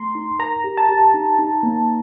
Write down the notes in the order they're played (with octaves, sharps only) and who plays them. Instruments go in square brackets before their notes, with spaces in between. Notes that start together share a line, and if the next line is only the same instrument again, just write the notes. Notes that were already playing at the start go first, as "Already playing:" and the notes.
Already playing: [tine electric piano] A3 [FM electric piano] A#5 C6
[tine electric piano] D#4
[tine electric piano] A#4 [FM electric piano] A#5
[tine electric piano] G4
[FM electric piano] A5
[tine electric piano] G4
D#4
D#4
A#3